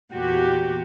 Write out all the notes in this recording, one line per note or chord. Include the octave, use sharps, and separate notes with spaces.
E2 A#2 F#4 G4